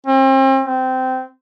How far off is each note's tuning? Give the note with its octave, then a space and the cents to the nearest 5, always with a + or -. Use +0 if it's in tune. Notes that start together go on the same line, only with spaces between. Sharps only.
C4 +40
C4 -20